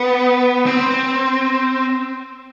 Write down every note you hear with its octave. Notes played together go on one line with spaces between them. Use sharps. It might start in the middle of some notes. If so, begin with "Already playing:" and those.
Already playing: B3
C4